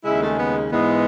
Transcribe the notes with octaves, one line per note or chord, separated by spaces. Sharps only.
D#2 C#3 G#3 E4
A3
B3
G#2 E3 G#3 B3